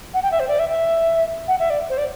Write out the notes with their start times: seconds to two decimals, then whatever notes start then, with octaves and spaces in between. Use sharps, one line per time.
0.14 F#5
0.23 G5
0.32 E5
0.40 C5
0.48 D5
0.59 E5
0.69 E5
1.48 F#5
1.59 E5
1.70 D5
1.90 C5
1.98 D5